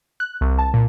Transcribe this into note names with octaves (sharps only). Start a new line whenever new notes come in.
F#6
C2
A5
A#2